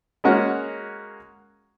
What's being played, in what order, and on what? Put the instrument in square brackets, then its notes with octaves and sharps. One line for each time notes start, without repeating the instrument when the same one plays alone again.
[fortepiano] G#3 A#3 C#4 F#4 F#5